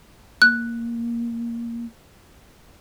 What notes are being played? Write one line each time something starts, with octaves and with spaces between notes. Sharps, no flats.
A#3 F#6